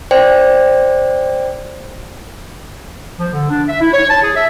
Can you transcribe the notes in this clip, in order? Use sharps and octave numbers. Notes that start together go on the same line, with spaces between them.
C5 D5 G5
F3
D3
D4
E5
E4
C#5
A5
G#4
E5